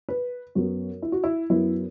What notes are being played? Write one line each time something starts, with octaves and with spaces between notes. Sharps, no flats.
B4
F#2 F#3 B3 F#4
E4
F#4
E4
F#2 F#3 B3 E4